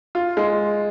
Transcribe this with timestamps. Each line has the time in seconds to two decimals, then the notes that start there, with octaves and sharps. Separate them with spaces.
0.15 F4
0.37 G#3